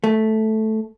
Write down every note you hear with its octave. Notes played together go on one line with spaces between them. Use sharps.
A3